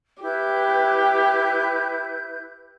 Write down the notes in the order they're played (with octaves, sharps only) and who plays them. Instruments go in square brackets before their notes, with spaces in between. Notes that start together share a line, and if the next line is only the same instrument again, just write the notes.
[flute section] E4 B4 G6 [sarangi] G4